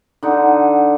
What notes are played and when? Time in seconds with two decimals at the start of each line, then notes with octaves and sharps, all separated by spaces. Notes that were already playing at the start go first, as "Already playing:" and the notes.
0.23 D3 D#4 F#5